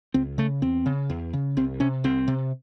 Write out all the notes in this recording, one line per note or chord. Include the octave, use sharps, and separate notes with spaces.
C#2 C4
C#3 A3
E2 C4
C#3
E2
C#3
C2 C4
C3 C#4
C2 C4
C3